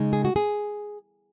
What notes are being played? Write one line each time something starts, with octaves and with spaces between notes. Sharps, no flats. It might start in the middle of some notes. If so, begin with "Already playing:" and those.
Already playing: C#3 G#3 D#4
G#4
F#4
G#4